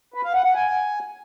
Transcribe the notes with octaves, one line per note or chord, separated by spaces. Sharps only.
B4
F5
F#5
F#5
G#5